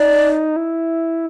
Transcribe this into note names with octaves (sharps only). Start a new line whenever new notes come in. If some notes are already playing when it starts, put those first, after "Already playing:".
Already playing: D#4 D5
E4